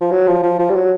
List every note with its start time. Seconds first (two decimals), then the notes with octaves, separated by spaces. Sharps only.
0.01 F3
0.11 F#3
0.27 F3
0.43 F3
0.59 F3
0.70 G3
0.75 F#3